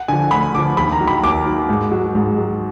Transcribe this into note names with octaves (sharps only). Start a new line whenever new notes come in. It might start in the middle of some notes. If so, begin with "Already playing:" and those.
Already playing: F#5
D3 F3 G#5
D2 B5
D3 F3 D6
D#2 B5
A#5
D#3 F#3
B5
D#2 D6
D#3 F#3
G#2
F#3
G#2
F#3